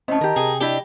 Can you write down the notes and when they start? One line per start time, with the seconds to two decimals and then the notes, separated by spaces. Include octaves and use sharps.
0.08 A2 C4 C#4 D#5 A5
0.21 D#3 G4 A#4
0.36 C3 G#4 G5
0.61 D4 E4 G4 D#5